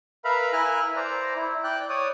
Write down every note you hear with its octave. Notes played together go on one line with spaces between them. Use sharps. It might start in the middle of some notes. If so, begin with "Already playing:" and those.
A#4 B4 E5 F5 A#5 B5
E4 A#4 E5 G#5 F6 F#6
C5 D5 A#5
E4
D5 G5 F#6
C#5 D5 D#6